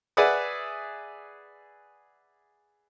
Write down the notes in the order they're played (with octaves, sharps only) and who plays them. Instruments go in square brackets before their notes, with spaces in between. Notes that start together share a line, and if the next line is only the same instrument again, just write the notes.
[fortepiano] G#4 B4 D5 E5 F#5 D#6